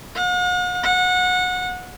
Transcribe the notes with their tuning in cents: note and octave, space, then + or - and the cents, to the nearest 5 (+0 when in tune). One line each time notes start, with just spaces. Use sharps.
F#5 -45
F#5 -25